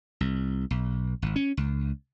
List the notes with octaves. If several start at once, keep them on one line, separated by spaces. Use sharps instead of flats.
C2
B1
G#1
C#4
C#2